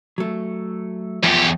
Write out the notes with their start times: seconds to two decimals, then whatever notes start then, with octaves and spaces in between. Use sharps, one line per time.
0.18 F#3 A3
1.23 E2 F3 G4